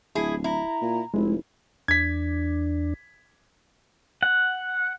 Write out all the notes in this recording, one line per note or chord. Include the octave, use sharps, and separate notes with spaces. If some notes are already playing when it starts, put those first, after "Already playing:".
D1 E4 G#4
E4 A#5
A#2
F1 G#3 E4
E2 D4 G#6 B6
F#5